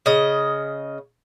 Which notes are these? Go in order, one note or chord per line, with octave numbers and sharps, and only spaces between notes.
C#3 D#5